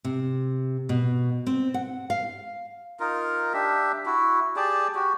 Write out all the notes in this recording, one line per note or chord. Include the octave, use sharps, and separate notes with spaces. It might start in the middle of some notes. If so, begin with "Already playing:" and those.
C3
B2
C4
F#5
F5
D#4 F4 A#4
D4 G4 E5
E4 F#4
G4 G#4 D5 A5
F#4 G4